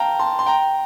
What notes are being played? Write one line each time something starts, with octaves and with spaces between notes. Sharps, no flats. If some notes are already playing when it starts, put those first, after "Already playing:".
Already playing: F5 G5 A5 A#5
A5 C6
C6
G5 A#5